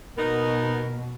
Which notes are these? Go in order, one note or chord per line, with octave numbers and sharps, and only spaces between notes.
B2 B3 D#4 A#4